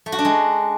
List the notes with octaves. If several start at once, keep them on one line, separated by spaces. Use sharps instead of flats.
A3
F#4
D4
G#3